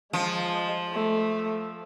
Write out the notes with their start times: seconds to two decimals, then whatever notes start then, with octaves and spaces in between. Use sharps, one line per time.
0.13 F3 G#3
0.93 A3